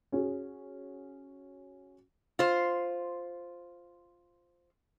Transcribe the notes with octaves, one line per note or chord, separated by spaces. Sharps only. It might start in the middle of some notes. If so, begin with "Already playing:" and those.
C#4 F#4 G#4
F4 C5